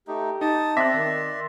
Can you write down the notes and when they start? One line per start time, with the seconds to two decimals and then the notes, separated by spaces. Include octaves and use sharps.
0.08 A3 D#4 G4
0.41 D#4 A5 D#6
0.77 C4 D5 E5 C6 D6 F#6 A#6 B6
0.94 D#3